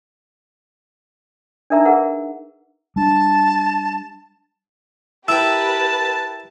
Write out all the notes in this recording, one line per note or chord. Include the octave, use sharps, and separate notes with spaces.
D4 D#4 A#4 E5 A5 A#5
G#4 A#4 B4 F#5
G3 D4 A5
E4 G4 A#4 B4 G5 A5 E6